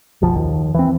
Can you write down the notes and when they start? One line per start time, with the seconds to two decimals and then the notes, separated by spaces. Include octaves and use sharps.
0.22 F#1 B1 F3
0.35 D#2
0.74 E3 C4